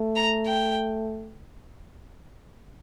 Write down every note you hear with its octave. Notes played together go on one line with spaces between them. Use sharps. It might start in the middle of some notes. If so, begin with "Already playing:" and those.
Already playing: A3
A#5
G5